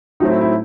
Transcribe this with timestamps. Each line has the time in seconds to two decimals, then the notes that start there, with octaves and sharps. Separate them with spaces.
0.20 A2 F#3 A3 C4 D#4
0.30 E4
0.41 E4